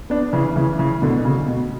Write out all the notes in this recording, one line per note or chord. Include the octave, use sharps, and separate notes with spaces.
B3 D4
C#3 E3
C#3 E3
C#3 E3
B2 D3
B2
C#3
B2